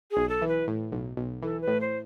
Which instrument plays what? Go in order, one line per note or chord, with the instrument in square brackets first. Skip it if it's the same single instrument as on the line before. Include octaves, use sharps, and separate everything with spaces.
[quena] G#4
[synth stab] B1
[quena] A4
[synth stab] E3
[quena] B4
[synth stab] A2
B1
B1
[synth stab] E3 [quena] A4
[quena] B4
[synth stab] A2
[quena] C5